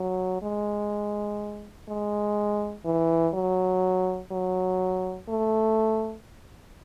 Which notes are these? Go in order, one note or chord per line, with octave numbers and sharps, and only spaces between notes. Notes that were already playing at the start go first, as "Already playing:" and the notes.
Already playing: F#3
G#3
G#3
E3
F#3
F#3
A3